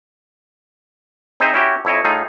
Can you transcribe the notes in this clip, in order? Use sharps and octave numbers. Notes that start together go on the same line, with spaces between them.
C4 D#4 G#4 C5 D#5 E5
C#4 E4 F#4 G4
F2 E4 C#5 D#5
A2 A3 D#4 F4 G#4